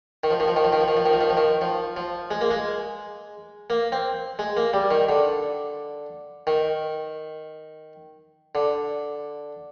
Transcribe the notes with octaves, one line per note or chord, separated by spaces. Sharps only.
D#3
F3
D#3
F3
D#3
F3
D#3
F3
D#3
F3
D#3
F3
D#3
F3
D#3
F3
F3
G#3
A#3
G#3
A#3
C4
G#3
A#3
G3
D#3
D3
D#3
D3